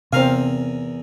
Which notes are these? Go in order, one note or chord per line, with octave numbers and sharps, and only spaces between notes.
E2 C3 C4 A#4 F5 G#5